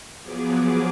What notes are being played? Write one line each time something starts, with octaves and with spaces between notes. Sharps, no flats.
F3 F#3 B3 G#4 D6